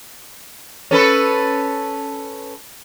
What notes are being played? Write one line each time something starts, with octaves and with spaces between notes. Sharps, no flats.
C#4 A4 B4